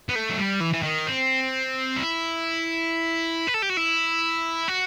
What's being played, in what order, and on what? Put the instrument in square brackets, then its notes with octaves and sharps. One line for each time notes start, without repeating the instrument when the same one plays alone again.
[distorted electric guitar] B3
A3
F#3
G3
E3
E3
D#3
C4
E4
B4
A4
G4
F#4
E4
F#4